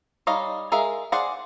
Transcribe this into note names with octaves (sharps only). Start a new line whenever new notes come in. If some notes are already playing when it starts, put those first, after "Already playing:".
G3 D#4 C#5 D#5 F5
G#3 G#4 A#4 E5 F5
G#4 C5 D5 F5 F#5